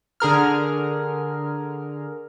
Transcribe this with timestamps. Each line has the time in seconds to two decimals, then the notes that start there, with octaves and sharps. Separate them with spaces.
0.20 D3 G#4 A#4 F6